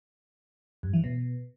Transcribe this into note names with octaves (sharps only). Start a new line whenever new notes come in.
G2
E3
B2